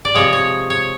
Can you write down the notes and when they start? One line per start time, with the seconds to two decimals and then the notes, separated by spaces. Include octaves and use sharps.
0.05 D5
0.15 C3 F3 G#3 C#5
0.33 C#5
0.70 C#5